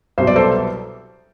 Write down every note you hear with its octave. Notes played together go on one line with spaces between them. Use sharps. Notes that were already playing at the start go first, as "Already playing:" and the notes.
C2 B2 F#3 C5
D5
A4 C5